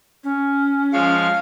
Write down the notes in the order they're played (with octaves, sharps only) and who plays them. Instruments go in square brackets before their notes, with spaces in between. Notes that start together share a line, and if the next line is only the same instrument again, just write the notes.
[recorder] C#4
[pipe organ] F3 G#3 C#5 [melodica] F5